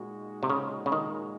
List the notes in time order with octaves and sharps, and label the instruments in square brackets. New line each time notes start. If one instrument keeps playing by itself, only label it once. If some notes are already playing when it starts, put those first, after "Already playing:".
Already playing: [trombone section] A#2 G#3 D#4 F#4
[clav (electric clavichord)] C3
C#3
C#3
D#3